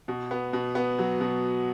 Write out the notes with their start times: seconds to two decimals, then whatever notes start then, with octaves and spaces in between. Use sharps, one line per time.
0.08 B2
0.31 B3
0.53 B2
0.75 B3
0.99 F#3
1.21 B2